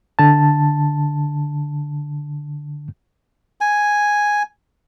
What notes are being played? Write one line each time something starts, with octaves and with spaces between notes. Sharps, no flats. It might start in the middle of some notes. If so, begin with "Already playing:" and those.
D3 A5
G#5